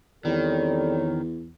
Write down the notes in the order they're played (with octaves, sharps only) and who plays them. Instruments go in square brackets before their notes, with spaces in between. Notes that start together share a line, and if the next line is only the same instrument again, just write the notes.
[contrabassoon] E2 [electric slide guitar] D#3 [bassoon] G3 [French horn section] C4 A4 C#5